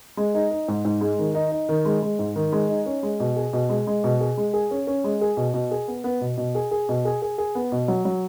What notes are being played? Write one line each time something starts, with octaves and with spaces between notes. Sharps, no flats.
G#3
D#4
D#4
G#2
G#2
G#3
D#3
D#4
D#4
D#3
G#3
G#3
G#2
D#3
G#3
D#4
C#4
G#3
B2
G#4
B2
G#3
G#3
B2
G#4
G#3
G#4
C#4
C#4
G#3
G#4
B2
B2
G#4
B3
B3
B2
B2
G#4
G#4
B2
G#4
G#4
G#4
B3
B2
F#3
F#3